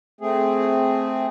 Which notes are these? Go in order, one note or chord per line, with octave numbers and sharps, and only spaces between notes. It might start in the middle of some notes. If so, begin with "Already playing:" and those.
A3 C4 G#4